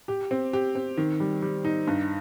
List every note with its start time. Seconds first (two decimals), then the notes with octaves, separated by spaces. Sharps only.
0.08 G4
0.31 C4
0.53 G4
0.75 C4
0.97 D#3
1.20 G3
1.42 G3
1.65 D#4
1.87 G2